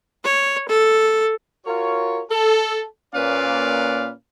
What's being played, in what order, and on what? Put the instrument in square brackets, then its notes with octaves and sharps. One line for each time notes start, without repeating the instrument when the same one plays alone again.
[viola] C#5
A4
[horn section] F4 F#4 A#4 C#5
A4
A#2 A#3 C#4 B4 D5 F5